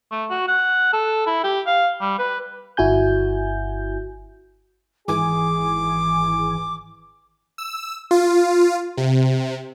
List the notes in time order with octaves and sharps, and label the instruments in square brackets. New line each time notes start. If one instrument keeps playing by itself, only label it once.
[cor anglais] A3
F#4
F#5
A4
E4
G4
F5
G3
B4
[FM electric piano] G1 E4 F#4 G#5 G6
[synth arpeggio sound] G#1 E3 G#5 [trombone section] G#4 [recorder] D6
[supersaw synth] E6
F4
C3